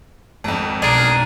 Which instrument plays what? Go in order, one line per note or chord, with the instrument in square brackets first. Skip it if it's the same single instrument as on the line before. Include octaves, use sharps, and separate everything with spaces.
[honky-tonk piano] G#1 F2
[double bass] B1 [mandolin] D4 A#4 [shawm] G#4